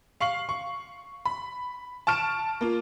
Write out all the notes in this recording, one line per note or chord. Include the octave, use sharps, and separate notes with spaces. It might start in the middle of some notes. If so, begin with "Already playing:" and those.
F5 C#6 C7 F#7
C#6
B5
A5 C#6 F6 D7 E7
A#3 F4